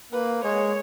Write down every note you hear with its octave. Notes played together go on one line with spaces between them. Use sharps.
A#3 B4
G#3 C#5